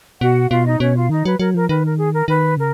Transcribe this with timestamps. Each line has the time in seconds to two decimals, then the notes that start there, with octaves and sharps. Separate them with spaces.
0.21 B2 F#4 F#5
0.51 B2 F4 F5
0.66 D#4 D#5
0.80 B2 C#4 C#5
0.95 F4 F5
1.10 D#3 D#4 D#5
1.25 F#3 B4
1.40 F#3 A#4
1.54 F3 A#4
1.69 D#3 B4
1.84 A#4
1.98 G#4
2.13 A#4
2.28 D#3 B4
2.57 C#3 A#4